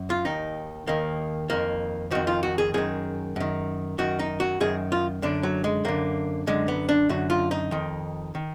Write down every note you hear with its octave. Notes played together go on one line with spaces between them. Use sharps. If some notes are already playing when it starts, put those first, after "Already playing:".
Already playing: F#2
F4
D#2 D#3 D#4
D#2 D#3 A#3
F2 D#3 A#3
F2 D#3 F#4
F4
F#4
G#4
F#2 D#3 G#4
F#2 D#3
F#2 D#3 F#4
D#4
F#4
F#2 D#3 G#4
F4
F#2 D3 D4
F#3
G#3
F#2 D3 A#3
F#2 D3 G#3
B3
D4
F#2 D3 F#4
F4
D#4
F2 D#3
D#3